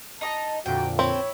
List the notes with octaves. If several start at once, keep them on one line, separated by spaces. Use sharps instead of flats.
D#4 D#5 A5 A#5
F2 A#2 D3 F#4 G5
C4 E4 C#5